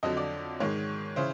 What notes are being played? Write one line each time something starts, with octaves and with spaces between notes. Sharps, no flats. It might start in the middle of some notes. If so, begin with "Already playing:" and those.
F2 D3 F#3 D#5
D5
G#2 D#3 G#3 C#5
C#3 E3 C5